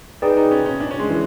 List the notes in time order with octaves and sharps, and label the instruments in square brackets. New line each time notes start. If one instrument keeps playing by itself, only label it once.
[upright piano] D#4 [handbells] G#4 B4 D5 G5
[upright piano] D#4
C#4
C#4
D4
C#4
G#3
E3